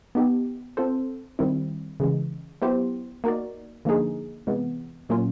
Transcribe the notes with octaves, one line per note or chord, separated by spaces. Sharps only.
B3 D#4 G4
C4 F4 A4 C5
D#3 G3 C4 E4
C#3 E3 G#3
F#3 B3 E4 G4 C5
A#3 D#4 F#4 A#4 D5
D3 F3 A#3 D#4 G#4
C3 E3 G#3 B3
A#2 F#3 A#3 C#4 F4